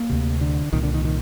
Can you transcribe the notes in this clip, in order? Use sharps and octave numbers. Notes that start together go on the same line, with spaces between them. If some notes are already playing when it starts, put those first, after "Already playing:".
Already playing: A#3
D2 C3
D3
C2 A#2 D#3
D3
D#3
D#3